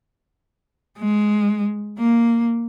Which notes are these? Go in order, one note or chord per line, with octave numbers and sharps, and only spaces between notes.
G#3
A#3